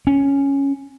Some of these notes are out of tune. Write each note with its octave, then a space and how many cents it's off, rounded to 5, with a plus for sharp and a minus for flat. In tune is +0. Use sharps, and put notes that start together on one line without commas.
C#4 +0